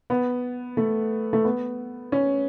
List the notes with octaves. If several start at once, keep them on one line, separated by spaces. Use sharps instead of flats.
B3
A3
A3
B3
C#4